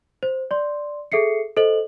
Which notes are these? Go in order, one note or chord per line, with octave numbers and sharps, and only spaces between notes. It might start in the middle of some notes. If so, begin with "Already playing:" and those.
C5
D5 C6
G#4 A4 E5 C7 C#7
A4 C5 D#5 F#7